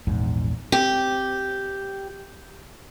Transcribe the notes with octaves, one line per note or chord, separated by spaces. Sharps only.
A#1 E2 G#2
C4 G4